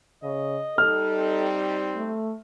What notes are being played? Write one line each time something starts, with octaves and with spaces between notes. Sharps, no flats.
C#3 D#5
G3 D#4 A4 F6
C4
A3